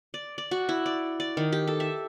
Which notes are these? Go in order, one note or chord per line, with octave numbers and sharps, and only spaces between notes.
D5
D5
F#4
E4
D5
D5
D#3
G4
A4
E5